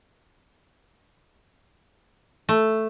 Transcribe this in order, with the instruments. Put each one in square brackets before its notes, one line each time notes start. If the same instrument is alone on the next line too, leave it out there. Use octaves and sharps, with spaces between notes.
[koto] A3